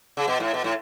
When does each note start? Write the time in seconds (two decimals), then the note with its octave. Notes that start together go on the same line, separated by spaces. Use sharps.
0.17 C#3
0.28 B2
0.40 A2
0.54 B2
0.64 A2